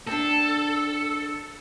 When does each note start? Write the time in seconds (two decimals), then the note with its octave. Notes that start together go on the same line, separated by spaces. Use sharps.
0.07 C4 D4 A4